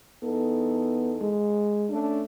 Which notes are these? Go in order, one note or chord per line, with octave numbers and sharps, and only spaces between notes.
E2 B3 D#4 A4
G#3
A3 C#4 D4